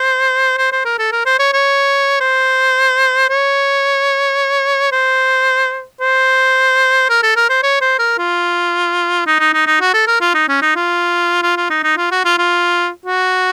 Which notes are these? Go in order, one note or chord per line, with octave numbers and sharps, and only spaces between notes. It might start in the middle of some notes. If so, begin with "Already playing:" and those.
Already playing: C5
C5
C5
A#4
A4
A#4
C5
C#5
C#5
C5
C#5
C5
C5
A#4
A4
A#4
C5
C#5
C5
A#4
F4
D#4
D#4
D#4
D#4
F#4
A4
A#4
F4
D#4
C#4
D#4
F4
F4
F4
D#4
D#4
F4
F#4
F4
F4
F#4